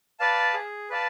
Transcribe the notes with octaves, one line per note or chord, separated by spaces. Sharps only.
B4 D5 F5 A5
G#4
B4 D5 F5 A5